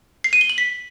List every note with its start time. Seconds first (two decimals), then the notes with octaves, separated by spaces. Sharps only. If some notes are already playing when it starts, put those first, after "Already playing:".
0.24 C7
0.33 D#7
0.41 G7
0.49 F#7
0.58 B6